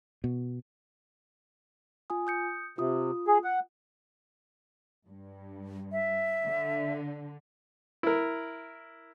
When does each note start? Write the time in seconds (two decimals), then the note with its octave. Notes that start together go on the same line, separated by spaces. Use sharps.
0.24 B2
2.10 F4 G#5 D#6
2.27 D#6 G6 C#7
2.78 C3 F4 D#6
3.28 G#4
3.44 F#5
5.07 G2
5.92 E5
6.46 D3
8.03 E4 A#4